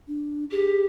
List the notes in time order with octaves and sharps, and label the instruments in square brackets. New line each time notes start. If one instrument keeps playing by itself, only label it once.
[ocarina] D4
[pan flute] G4 [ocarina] G#4